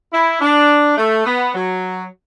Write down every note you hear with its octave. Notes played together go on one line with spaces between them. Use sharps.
E4
D4
A3
B3
F#3